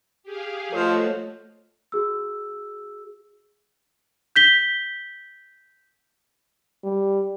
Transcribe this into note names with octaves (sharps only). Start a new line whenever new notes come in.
G4 G#4 F5
F3 A3 F#4 A4 C#5 D#5
F#4 G#4 E6
G6 B6 G7
G3